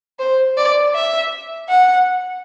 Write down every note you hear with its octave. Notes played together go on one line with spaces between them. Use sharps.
C5
D5
E5
F#5